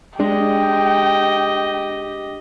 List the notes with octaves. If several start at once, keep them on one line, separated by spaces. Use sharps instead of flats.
G#3 D4 G4 D#5 G5